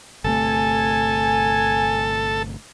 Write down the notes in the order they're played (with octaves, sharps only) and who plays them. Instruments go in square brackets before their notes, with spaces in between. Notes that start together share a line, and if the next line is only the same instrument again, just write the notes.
[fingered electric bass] G1 C3 A3 [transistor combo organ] A4 [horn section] G#5